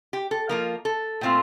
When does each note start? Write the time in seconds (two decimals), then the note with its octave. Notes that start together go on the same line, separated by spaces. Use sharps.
0.13 G4
0.31 A4
0.49 F3 A#3 F4 A#4
0.85 A4
1.21 A#2 A3 C4 F4